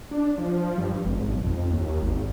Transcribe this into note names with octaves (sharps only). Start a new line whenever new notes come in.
D4
F3
G2
G#1
B1
F2
D#2
G#1